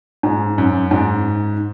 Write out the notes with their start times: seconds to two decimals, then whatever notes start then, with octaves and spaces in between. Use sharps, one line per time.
0.23 G#2
0.58 F#2
0.91 G#2